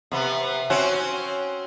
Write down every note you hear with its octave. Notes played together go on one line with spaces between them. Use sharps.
C3 B3
C4 C#4 F#4